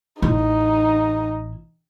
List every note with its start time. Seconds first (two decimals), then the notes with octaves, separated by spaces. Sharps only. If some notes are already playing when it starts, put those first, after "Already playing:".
0.22 A1 D#4 E4